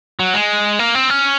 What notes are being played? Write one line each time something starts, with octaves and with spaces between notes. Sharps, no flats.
F#3
G#3
A#3
C4
C#4